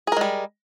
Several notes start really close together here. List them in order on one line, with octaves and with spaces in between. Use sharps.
G#4 A#4 G#3 G3